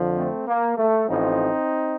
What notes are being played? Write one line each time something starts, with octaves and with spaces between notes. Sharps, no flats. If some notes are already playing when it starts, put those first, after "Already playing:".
Already playing: F2 D3 F3
A3 C4
A#3
A3
A1 A2 F3 C4 D#4